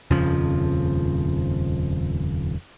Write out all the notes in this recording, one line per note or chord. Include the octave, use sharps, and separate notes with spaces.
D#1 F2 C#3 F3